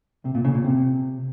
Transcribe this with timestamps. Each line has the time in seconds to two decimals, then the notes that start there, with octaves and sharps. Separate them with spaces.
0.25 C3
0.35 A#2
0.45 C#3
0.54 A#2
0.64 C3